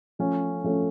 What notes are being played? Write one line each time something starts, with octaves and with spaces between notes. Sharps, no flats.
F3 A3 C#4
F3 A3 C#4